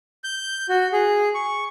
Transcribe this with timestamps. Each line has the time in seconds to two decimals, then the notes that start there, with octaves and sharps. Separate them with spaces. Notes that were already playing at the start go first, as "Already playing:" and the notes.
0.24 G6
0.69 F#4
0.93 G#4
1.35 C#6